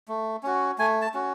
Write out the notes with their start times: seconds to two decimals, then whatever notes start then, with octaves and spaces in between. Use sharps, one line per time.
0.08 A3
0.43 C#4 F#4
0.78 A3 G#5
1.02 A5
1.14 C#4 F#4